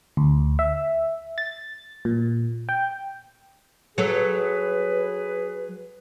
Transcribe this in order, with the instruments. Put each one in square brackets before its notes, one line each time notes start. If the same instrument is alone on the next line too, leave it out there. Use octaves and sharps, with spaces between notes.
[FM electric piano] D2
E5
A6
A#2
G5
[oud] F#3 A4 [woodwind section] G#4 B4